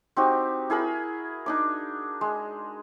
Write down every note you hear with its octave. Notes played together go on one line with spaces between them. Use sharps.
C4 D#4 F#4 G4
E4 G#4 A#4 B5
D4 D#4 D6
G#3